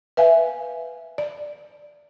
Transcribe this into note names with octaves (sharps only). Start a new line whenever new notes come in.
B4 E5 F5 G#5
D5